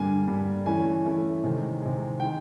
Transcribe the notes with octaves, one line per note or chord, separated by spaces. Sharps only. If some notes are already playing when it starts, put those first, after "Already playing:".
Already playing: G2 D3 G3 A#3 G#5
G2 D3 G3 A#3
E3 A3 C#4 E4 G#5
E3 A3 C#4 E4
C3 D#3 G#3
C3 D#3 G#3
D#3 G#3 G5